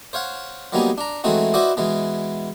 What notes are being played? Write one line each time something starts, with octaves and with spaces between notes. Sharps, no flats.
C5 C#5 F5 F#5
F#3 G3 A#3 B3 D#4 G#4
D4 A#5
E3 G#3 A3 C4 D#4 F#4
E4 F#4 B4 C5 D5 D#5
B2 E3 G#3 B3